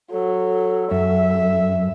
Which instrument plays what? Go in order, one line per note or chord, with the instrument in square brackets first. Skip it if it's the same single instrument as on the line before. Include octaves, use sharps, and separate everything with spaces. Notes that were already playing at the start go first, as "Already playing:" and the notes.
[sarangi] F#3 [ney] A4
[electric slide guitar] F#2 [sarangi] E5